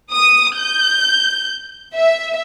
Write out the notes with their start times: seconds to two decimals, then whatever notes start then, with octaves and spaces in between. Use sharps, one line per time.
0.12 D#6
0.57 G6
1.94 E5